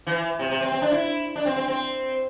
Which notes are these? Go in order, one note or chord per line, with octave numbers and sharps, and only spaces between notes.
E3
C3
C3
C4
C4
D4
E4
D4
C4
C4
C4